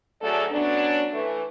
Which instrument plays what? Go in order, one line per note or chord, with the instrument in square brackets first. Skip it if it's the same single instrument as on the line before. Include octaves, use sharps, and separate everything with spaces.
[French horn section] D2 F#3 A3 G#4 A4 D5
F#3 B3 C#4 D4
E3 A3